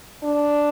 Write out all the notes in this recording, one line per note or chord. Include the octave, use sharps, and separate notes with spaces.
D4